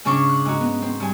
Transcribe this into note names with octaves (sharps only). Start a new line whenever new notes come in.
G#2 C#3 C#4 D4 C#6 D6
F#6
G#2 D#4 F#4
B3
C4
G2 G#5